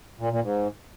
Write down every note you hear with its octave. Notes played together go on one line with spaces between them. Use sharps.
A#2
A#2
G#2